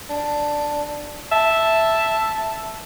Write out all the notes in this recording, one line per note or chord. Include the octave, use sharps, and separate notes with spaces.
D4
E5 A5